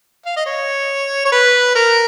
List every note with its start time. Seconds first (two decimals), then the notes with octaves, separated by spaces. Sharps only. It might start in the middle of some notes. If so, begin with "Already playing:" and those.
0.26 F5
0.36 D#5
0.46 C#5
1.25 C#5
1.32 B4
1.75 A#4